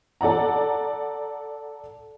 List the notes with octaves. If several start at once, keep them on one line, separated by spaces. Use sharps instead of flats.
A4 D5 F#5 A#5